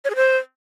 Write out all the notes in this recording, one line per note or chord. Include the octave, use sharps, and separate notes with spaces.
C#5
G#4
C5